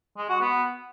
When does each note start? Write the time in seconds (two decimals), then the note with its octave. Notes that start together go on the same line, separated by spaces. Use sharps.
0.18 G#3
0.29 F#4
0.41 B3